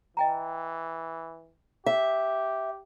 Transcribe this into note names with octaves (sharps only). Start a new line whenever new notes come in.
E3 D#5 G5 A#5
G4 E5